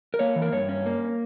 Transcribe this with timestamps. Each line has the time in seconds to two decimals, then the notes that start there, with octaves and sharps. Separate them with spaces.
0.14 A#4
0.19 A#3 C#5
0.36 E3
0.42 A#4
0.52 G2 C#5
0.69 C#4
0.86 A#3